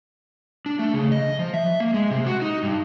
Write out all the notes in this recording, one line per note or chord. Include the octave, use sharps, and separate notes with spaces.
D4
A3
C#3
D#5
F3
E5
A#3
G#3
C3
F#4
D#4
G2